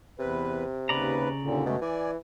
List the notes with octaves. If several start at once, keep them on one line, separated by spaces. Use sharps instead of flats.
E2 C3 B4
D#2 C#3 B4 D5 A#5
D#2 A#2 D3
F#2 B2 G#3 A3
E3 D5 G#5